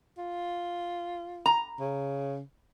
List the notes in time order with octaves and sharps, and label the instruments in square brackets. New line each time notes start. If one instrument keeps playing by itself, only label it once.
[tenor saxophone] F4
[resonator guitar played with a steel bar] A#5
[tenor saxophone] C#3